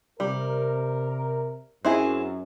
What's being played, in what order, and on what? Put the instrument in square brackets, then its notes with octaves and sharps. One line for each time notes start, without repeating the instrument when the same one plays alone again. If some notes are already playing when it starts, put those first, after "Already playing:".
[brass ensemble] C3 A#4 [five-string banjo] G3
[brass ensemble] F#2 [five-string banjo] C4 E4 G#4